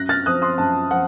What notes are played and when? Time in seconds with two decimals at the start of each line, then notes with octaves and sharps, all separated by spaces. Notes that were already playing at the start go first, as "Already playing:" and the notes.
Already playing: F#2 F#6 A#6
0.09 F6 A6
0.26 F3 C4 D#6 F#6
0.42 C6 D#6
0.58 F#2 A5
0.91 F3 F#5